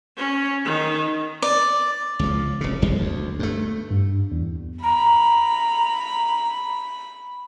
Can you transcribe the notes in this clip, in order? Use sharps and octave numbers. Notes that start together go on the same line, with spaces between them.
C#4
D#3
D5
C#2 F3
F1 C#3
G1 F2 G#3
D2
G2 A3
G2
E2
A#5 B5